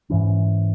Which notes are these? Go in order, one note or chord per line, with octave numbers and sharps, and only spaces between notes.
G#2 E3 C#4